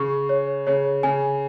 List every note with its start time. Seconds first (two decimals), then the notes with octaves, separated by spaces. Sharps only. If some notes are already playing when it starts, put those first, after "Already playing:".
Already playing: C#3 C#6
0.29 C#5
0.67 C#3 C#5
1.03 C#3 G#5